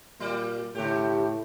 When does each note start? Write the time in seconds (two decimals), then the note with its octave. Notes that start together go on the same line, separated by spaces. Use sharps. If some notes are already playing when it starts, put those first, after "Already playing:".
0.20 A#2 F#3 D5
0.75 A2 C#3 G4